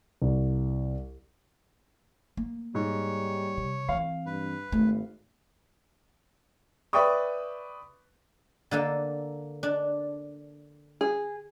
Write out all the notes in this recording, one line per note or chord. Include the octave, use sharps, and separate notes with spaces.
C2
A#3
G#2 G3 C#5
C3
E3 C4 F5
G2 B4
G#1 A3
B4 D5 E5 G5 C#6 D#6
D3 A#3 A4
D4
G#4